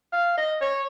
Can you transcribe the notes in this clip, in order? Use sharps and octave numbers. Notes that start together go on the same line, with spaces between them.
F5
D#5
C#5